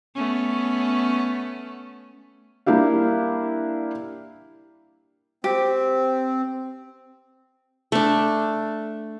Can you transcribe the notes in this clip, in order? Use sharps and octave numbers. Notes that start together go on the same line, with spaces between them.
A3 B3 C#4
G3 A#3 D4 E4 G4 F5
C4 G4
A3 D4